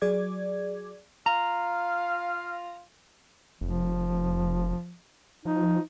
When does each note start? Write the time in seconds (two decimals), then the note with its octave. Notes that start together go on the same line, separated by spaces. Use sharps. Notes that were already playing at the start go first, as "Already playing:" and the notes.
0.02 F#3 G#4 D5 D6 G#6
1.26 F4 F5 A#5
3.61 F1 F3
5.45 F3 D#4